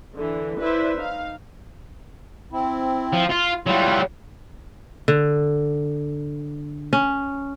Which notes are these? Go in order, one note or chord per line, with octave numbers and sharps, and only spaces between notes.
D3 E3
E4 B4 C5 D5 E5
D#4 F5
C4 E4
F3
F4
F#3 G3 E4 F4
D3
C#4